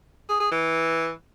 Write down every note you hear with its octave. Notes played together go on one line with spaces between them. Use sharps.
G#4
G#4
E3